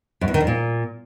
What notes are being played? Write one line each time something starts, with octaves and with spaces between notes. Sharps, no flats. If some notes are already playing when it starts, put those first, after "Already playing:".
F#2
E2
D#3
F2
A#2